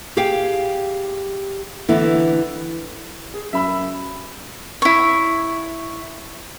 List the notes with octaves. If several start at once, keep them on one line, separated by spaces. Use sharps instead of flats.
G4 G#4 F5 G5
D3 E3 B3 E4
G#4
F#2 E5 B5 E6
E4 C#5